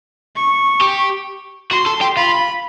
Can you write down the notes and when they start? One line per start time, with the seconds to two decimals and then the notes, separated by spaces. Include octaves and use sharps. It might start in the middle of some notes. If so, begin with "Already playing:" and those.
0.36 C#6
0.81 G4
1.71 F#4 C6
1.86 A4
2.01 G4
2.17 F4 B5